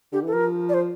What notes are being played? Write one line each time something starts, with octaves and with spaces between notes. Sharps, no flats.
D3 G4
E3
A4
F3 A#4
D5
C5